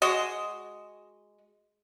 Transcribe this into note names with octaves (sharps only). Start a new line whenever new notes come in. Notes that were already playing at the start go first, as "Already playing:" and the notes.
G#3 F#4 D#5